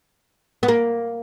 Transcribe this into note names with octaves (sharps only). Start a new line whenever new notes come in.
B3
A#3